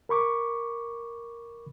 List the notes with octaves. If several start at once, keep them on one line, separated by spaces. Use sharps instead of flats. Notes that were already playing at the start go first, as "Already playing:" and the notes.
A#4 B5 C#6 D6